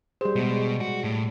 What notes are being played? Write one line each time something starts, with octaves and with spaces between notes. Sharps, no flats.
G3 G#4 C5
B2 G3 G#3
F#4
A2